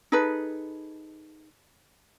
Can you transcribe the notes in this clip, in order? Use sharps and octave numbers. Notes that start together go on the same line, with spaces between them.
D#4 G#4 A4 B4